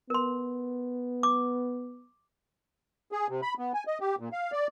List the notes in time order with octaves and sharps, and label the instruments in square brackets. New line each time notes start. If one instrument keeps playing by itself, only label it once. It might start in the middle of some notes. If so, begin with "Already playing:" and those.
[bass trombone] B3 [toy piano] A#4 C6
[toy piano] D6
[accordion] G#4
C3
B5
B3
G#5
D#5
G4
A#2
F5
D5